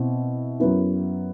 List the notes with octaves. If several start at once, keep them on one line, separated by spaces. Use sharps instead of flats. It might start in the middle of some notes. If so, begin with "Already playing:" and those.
Already playing: B2 C4 E4
F#2 F#3 B3 E4